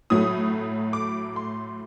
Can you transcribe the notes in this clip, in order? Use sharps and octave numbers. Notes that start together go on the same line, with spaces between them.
A2 F#3 A3 D#6
D6
C6